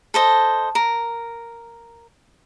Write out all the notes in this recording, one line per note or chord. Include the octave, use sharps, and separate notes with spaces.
A4 C5 D#5
A#4